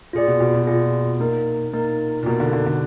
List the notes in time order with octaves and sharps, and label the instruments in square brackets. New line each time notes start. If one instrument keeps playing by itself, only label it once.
[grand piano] A#2 [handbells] F4 G#4 D5
[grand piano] B2
B2
B2
[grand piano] A#2 [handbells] F4 G#4 D5
[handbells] A#3 D#4 A#4
A#3 D#4 A#4
[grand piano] A#2
[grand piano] B2 [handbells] A#3 D#4 A#4
[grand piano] D3
D3
D3